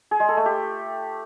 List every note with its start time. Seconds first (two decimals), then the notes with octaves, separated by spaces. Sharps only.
0.11 G#4
0.20 G#3
0.28 A4
0.37 A3
0.46 G4